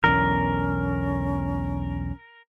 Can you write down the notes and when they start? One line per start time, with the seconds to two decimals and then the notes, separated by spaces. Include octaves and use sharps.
0.04 B1 E2 D3 C#4 A#4